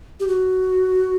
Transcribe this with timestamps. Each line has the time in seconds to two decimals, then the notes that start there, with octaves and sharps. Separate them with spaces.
0.20 G4
0.28 F#4